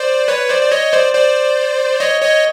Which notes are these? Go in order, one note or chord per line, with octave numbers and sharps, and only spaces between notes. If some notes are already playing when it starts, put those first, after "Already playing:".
Already playing: C5 D5
B4 C#5
C5 D5
D5
C#5 D#5
C5 D5
C5 D5
C#5 D#5
C#5 D#5